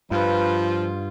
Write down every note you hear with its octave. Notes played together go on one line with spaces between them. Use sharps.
G2 F3 F4 B4